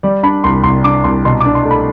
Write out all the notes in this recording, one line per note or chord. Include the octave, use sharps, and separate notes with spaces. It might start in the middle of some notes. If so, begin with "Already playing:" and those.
G3 D5
D4 B5
C2 C6
C2 C6
D4 D6
C2 C6
B2 C6
D6
D4
C6
A3
B5